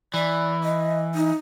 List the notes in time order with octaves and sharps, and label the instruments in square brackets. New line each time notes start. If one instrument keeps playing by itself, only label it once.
[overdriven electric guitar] E3 [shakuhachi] D5
[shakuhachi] D#5
D#4